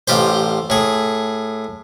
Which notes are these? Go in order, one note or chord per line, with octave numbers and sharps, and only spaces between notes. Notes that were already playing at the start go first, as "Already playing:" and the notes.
A1 F4 G4 C5
A2 G#4